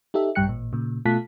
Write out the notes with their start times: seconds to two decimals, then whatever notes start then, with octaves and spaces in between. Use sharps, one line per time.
0.14 D#4 G4 A4 E5
0.35 A#1 G2 G3 G5 F#6 C#7
0.47 A1 A#2
0.73 A#2 C#3
1.05 B2 A3 F4 A5 F#6 B6